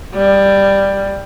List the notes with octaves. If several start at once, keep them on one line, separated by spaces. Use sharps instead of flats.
G3